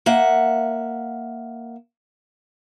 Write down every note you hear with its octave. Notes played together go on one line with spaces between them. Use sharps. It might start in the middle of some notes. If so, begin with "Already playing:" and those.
A#3 E5 F#5